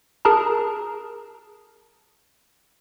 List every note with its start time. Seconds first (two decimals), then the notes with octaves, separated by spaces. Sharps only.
0.25 G#4 A#4 A5 A#5